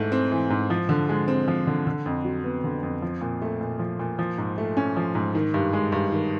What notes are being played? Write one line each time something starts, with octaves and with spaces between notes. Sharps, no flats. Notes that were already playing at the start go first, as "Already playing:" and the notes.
Already playing: G#2 E3 A3
C4
E3
G#2
F3
D3
G#3
C4
F3
D3
D3
F2
F#3
B3
D3
F2
F3
A#2
A3
A#2
F3
A#2
F3
G#2
A3
C#4
F3
G#2
D#3
G2
G#3
G2
D#3